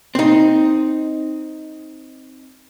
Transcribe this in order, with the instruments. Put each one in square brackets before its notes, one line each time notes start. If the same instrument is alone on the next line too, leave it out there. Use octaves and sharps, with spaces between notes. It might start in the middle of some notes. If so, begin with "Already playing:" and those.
[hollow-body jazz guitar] C4 D#4